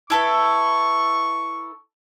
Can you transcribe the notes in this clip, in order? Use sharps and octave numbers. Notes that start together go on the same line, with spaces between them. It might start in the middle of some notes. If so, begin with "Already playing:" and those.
E4 A4 B4 C#6